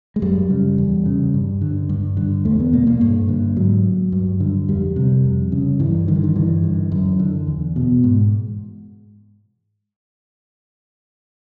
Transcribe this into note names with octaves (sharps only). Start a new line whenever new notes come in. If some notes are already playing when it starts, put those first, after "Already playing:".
G#3
F#2 G3
C#3
E2
C#3
G2
D3
G2
D3
E2 A3
B3
B2 A#3
A#3
G2
D3
G#2 F#3
G2
D3
F2 G3
C3
F2
C#3
G2 E3
D3 D#3
E3
D#3
G2 E3
D3
F#2
D3
E2
B2
G#2